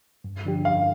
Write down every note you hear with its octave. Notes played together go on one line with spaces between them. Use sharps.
G2
D3 F3 D4 G4
G2 F5